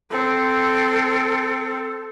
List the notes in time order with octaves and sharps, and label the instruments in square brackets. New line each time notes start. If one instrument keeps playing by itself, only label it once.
[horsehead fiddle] C4 [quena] A4